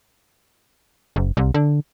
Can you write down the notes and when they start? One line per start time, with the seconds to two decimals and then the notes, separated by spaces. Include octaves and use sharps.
1.16 F#1
1.37 C2
1.54 D3